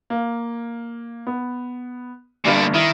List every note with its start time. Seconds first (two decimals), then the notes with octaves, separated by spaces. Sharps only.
0.10 A#3
1.27 B3
2.45 G1 G2 A#2 D3 D4
2.74 D#3 E4